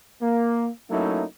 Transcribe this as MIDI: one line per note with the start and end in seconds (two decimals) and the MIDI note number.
0.22 0.69 58
0.91 1.23 54
0.91 1.23 57
0.91 1.23 58
0.91 1.23 61
0.91 1.23 63
0.91 1.23 64